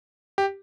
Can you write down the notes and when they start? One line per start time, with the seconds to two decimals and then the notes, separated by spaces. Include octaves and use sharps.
0.38 G4